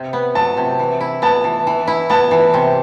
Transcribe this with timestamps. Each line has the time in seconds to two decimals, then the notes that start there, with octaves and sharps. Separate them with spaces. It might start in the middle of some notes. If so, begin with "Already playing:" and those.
Already playing: C3
0.13 B3
0.35 F#3 A5
0.57 C3
0.79 E3
1.01 E4
1.22 B3 A5
1.44 E3
1.67 E3
1.87 E4
2.10 B3 A5
2.31 E3
2.54 C3